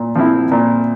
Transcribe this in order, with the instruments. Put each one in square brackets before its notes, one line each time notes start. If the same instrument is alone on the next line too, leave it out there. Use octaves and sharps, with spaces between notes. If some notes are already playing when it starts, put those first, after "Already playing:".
Already playing: [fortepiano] A#2
F3 C4 E4
A#2